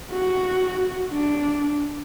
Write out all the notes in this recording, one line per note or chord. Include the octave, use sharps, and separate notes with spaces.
F#4
D4